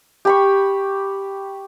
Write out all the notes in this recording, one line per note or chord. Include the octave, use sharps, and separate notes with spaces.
G4 B5 C#6